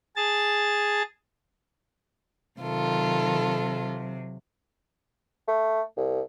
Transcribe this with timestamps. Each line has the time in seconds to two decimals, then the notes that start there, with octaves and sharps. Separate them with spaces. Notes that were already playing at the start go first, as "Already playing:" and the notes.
0.16 G#4 A5 A6
2.60 C3 D#3 F#3 F4 A4
5.48 A3
5.97 C2